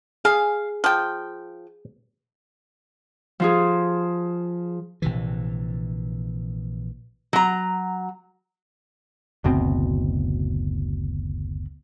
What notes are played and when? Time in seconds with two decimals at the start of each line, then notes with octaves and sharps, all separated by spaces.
0.25 G#4 F5
0.84 F3 G5
3.40 F3 F4 G#4
5.02 A#1 C3 E3
7.33 F#3 A#5
9.44 F#1 D2 B2 C4